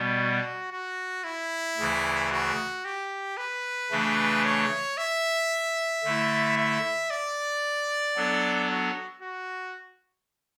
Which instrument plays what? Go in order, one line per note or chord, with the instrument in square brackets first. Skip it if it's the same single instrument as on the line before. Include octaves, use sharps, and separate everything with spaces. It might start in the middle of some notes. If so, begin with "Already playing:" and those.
Already playing: [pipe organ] B2 G3 B3
[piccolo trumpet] F#4
F#4
E4
[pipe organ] D2 C#3 E3
[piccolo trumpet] F#4
G4
B4
[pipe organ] C#3 E3 A3 D4
[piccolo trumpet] C#5
E5
[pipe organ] D3 A3 E4
[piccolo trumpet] E5
D5
[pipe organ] F#3 B3 D4 A4
[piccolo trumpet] F#4
F#4